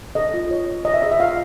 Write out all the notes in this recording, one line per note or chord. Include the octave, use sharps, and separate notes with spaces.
A4 D#5
F4
C#5
C#5
C#5 D#5
E5
G#4 D#5
E5
F4 F5